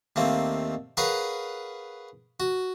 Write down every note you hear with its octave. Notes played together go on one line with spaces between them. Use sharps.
D#2 A3 A#3 C4
G#4 A#4 B4 C#5 F5 F#5
F#4